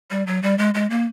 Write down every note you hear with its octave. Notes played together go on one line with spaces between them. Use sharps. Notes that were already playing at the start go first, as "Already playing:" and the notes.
G3
F#3
G3
G#3
G#3
A#3